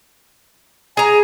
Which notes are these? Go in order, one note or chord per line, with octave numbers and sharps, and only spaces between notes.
G#4 G#5 A#5